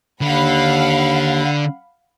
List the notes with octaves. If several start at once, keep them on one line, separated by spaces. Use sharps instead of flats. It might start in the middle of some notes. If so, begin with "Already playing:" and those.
D#2 D3 F5 F#5 B5